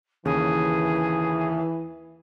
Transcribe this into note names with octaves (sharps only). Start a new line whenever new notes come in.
D#2 C#3 E3 G#4